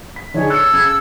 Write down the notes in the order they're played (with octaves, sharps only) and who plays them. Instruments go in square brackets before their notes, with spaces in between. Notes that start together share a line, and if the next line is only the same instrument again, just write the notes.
[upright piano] B6
[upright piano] D3 D#4 G#4 [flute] C#5
[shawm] A4 [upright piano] F#6 C#7
[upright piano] C#3 [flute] G#6
[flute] E6